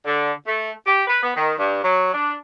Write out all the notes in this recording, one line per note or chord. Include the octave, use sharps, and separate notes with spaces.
D3
A3
G4
B4
B3
D#3
G2
F#3
D4